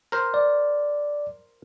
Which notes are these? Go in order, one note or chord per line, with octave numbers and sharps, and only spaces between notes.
A#4 C5
D5